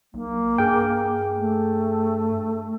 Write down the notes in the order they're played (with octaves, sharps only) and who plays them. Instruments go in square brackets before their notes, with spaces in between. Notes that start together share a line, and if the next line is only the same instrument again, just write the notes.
[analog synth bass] B1 [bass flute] A#3
[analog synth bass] G2 [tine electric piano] G#4 G5
[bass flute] A3